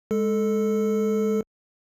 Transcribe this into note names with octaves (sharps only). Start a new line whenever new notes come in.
G#3 A4